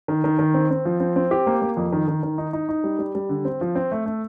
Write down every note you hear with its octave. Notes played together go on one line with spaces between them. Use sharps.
D#3
D#3
D#3
C4
C4
F3
C4
C4
G4
A#3
A#3
F2
D#3
D#3
D#3
D#4
D#4
D#4
G3
G3
G3
D3
C4
F3
C4
A3
A3